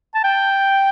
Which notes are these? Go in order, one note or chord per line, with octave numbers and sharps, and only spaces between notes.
A5
G5